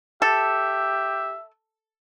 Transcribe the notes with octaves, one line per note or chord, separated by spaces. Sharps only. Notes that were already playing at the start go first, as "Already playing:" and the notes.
G4 A4 E5